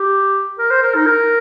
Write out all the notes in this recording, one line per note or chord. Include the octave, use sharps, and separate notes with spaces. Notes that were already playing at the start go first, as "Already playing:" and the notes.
Already playing: G4
A#4
C5
A#4
D#4
A#4